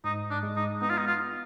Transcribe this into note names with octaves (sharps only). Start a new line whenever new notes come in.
G#2 D#4
D4
G#3
D#4
B3 D#4
F4
D#4
F4